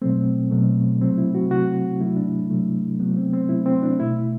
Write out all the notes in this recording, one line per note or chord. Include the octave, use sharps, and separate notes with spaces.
B2 F#3 A3 C4
B2 F#3 A3
C3 F#3 A3 C4
E4
F#4
C3 F#3 A3 F#4
C3 F#3 A3 E4
D4
C3 F#3 A3
C3 F#3 A3 B3
C4
C4
C3 F#3 A3 E4
C4
D4
B2 A3 E4